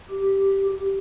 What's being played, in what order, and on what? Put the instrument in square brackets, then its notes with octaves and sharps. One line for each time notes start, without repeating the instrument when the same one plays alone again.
[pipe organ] G4